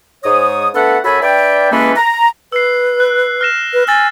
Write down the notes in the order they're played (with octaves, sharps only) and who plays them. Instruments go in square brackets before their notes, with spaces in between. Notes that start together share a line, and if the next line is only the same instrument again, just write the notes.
[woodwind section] G#2 C#5 D#6
A3 B3 D4 A4 B4 F#5
F#2 F#4 A4 C#5 G#5 B5
D4 B4 D5 E5 G5
E3 G#3 A#3 C#4 A4 B4
A#5
[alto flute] B4 [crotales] E6 C7
[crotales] F#6
F6 A#6 E7
[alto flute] B4
[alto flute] G#5 [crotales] E6 A6 A#6